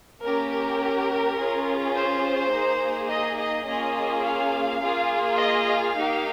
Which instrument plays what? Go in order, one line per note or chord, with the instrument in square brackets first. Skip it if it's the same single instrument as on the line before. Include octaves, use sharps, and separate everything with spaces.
[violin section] A#3 C#4 G4 A#4
A#4
C#4 F4 G#4
C5
A#3 D#4 G#4
D#5
D#5
A#3 C#4 F4 G#4 D#5
F5
A#3 F4 G#4
D#5
F5
A#3 D#4 G4